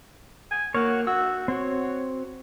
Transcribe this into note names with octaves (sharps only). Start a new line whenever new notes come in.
G#5
A#3 F#4 C#5
F#4 E6
C4 F#4 C#5